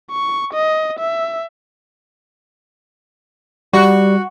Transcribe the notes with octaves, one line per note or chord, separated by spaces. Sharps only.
C#6
D#5
E5
G3 F#4